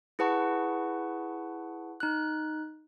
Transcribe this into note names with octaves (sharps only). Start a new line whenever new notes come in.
E4 G#4 B4 F#5 A5 C#6
D#4 F#6